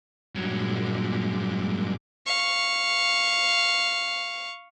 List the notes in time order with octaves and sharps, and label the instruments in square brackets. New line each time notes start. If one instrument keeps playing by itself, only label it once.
[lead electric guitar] G2 F#3 [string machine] A#2 G#3 D6
[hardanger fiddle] F5 C#6